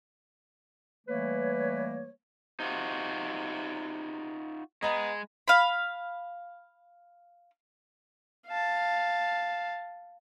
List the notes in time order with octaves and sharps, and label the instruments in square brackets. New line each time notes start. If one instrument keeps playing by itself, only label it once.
[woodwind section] E3 G3 A3 A#3 B4 C#5
[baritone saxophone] C3 [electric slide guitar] D#4 F4 F#4
[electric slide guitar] G#3 [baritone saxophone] B3 [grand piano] D#5 A#5 B5
[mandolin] F5 B5
[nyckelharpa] F5 A5